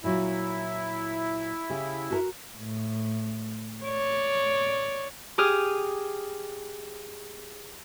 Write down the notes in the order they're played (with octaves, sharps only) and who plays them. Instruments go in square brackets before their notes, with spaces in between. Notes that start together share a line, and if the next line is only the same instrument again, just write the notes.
[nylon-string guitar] A#2 F#3 F4 [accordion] E4
[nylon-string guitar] C#3 G4
F#4 A4 A#4
[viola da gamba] A2
C#5 D5
[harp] G4 G#4 D#6 F6